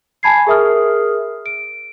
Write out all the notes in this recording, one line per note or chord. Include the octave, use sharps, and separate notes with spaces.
G#5 A5 B5 G#6 C7
G#4 A#4 E5 D#6 F6
D7